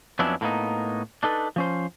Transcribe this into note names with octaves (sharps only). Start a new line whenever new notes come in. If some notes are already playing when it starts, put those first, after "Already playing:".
F2 F#3 B3 C#4 D4 E4
A2 A#3 B3 D#4
D4 D#4 A4 B4
F3 C#4 C5